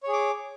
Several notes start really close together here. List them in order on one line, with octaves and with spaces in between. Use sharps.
C#5 G#4 D6